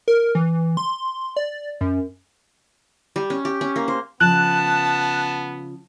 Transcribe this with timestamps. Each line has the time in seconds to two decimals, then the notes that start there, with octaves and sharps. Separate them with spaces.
0.08 A#4
0.35 E3
0.77 C6
1.37 D5
1.81 F#2
3.16 G3
3.30 C#4
3.45 G4
3.61 C#4
3.76 A#3
3.88 C5
4.20 C#3 F3 B3 A5 F#6